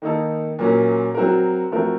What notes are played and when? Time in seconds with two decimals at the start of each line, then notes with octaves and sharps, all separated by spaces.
0.02 D#3 A#3 D#4 A4
0.59 A#2 F#3 A#3 C#4
1.14 F#3 C4 F#4 A#4
1.72 F3 A3 C4 F#4 A#4